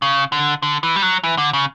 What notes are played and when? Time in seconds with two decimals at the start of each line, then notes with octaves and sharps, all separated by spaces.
0.02 C#3
0.32 D3
0.62 D3
0.83 E3
0.96 G3
1.02 F#3
1.24 E3
1.38 D3
1.53 C#3